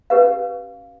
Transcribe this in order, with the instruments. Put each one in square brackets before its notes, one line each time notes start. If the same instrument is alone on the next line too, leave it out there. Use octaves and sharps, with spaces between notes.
[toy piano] C#4 G4 B4 F5